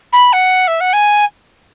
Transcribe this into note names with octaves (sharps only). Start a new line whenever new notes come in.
B5
F#5
E5
F#5
G#5